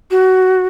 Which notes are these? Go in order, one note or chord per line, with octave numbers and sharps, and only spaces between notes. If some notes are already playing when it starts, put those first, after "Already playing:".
F#4